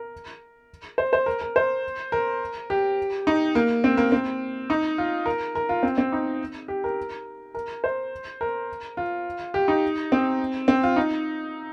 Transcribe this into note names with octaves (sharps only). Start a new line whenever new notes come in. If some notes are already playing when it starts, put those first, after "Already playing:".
Already playing: A#4
C5
C5
A#4
A#4
C5
A#4
G4
D#4
A#3
C4
A#3
C4
D#4
F4
A#4
A#4
F4
C4
C4
D#4
G4
A#4
A#4
C5
A#4
F4
G4
D#4
C4
C4
F4
D#4